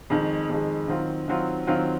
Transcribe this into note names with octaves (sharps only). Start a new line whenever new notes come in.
F2 D#3 G#3
F2 D#3 G#3
D#3 F#3 C4 F4
D#3 F#3 C4 F4
D#3 F#3 C4 F4